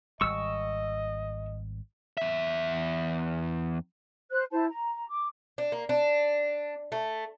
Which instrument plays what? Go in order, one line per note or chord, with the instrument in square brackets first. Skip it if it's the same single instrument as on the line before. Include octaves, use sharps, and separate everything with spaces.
[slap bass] G#1 G3 [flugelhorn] D#5 [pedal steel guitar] C#6 E6
[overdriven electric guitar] E2 E5
[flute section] C5 F#6
E4 C5 A5
A#5
D6
[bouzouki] D4
A#3
D4
A3